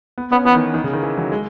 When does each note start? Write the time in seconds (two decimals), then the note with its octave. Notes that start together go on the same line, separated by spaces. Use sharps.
0.18 B3
0.32 B3 C#4
0.45 E3 B3
0.55 D#3
0.74 D#3
0.84 C#3
0.94 D#3
1.03 E3
1.18 F#3
1.32 G#3